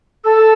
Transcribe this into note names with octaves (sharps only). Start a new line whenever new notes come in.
A4 E6